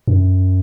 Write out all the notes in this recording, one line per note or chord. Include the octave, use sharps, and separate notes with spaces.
F#2